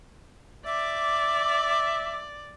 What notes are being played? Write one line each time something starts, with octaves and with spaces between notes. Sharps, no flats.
D5 E5 D6